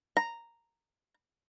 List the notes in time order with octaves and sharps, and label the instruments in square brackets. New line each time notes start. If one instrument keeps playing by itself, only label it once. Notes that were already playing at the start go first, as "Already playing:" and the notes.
[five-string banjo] A#5